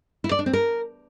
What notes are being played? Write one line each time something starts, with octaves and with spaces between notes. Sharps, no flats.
E4
D5
D4
C4
A#4